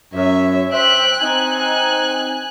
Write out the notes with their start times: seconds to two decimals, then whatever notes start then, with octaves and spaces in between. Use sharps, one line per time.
0.14 F#2 C#5 E5
0.72 C5 E5 G5 F#6
1.22 C4 D#4 G#5 F#6